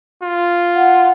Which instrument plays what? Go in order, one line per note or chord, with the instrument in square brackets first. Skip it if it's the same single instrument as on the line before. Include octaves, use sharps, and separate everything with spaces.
[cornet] F4
[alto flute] F#5